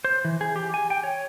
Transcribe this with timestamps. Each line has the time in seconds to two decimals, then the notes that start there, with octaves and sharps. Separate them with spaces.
0.05 C5
0.25 E3
0.41 G#4
0.56 G4
0.74 G#5
0.90 G5
1.04 C#5